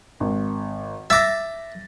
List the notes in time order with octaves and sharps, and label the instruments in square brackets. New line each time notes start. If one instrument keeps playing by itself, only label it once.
[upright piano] G#1
[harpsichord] E5 D6 [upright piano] A6 A#6